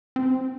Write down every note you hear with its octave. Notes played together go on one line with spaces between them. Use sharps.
C4